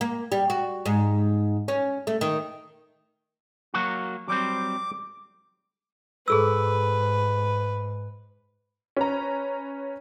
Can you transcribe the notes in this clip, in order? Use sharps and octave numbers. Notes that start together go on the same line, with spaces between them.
A#3
G3
F#4
G#2
C#4
A3
D#3
F#3 A#3 F#4
F#3 G3 C4 D6
G#2 G#4 A4 B4 E6
C#4 B4 A#5